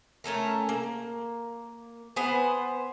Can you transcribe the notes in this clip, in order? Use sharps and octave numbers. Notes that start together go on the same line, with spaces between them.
A3 C#4 A4 A#4
A#3
B3 B4 C5 G#5